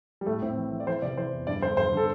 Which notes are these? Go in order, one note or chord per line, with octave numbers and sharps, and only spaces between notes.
G3
A2 A3
A2 C4
E3
E3
D5
E3 C5
C3 D5
E3 C5
E2
G2 D5
D3 C5
G2 C5
D3 A4